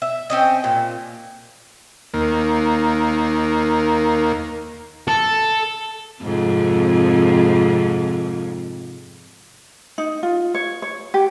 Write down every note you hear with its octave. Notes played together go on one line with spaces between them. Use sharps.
E5
C4 C#4 D#5
A#2
D#2 A#3
A4
F2 G#2 C3
D#4
F4
C#5
C#5
G4